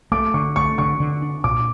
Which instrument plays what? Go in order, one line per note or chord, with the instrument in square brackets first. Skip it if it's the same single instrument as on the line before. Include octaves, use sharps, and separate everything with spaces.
[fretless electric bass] A3 [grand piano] D6
[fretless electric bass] D3 [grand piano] C#6
[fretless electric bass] A3 [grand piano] C#6
[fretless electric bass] D3 [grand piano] C#6
[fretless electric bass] D3
D4
[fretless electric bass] A#2 [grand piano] D6